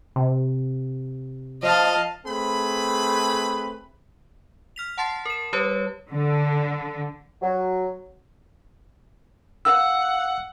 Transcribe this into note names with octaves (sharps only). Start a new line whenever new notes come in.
C3
F3 D#5 F5 A5
A3 C4 G#4 B4 B5
F6 B6 F7
F#5 A5 C6 A6 C7
A#4 E7
G3 G4 B4 C#5
D3
F#3
F5 F#5 E6